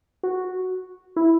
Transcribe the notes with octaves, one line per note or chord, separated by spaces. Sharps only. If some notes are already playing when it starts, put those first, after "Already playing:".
F#4
E4